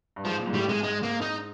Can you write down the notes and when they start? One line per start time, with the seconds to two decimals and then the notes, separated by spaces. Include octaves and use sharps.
0.16 G2
0.25 G#2 F3
0.39 A#2
0.47 G#2
0.54 A2 G3
0.69 G#2 G#3
0.83 G#2 G#3
1.03 A#3
1.22 D#4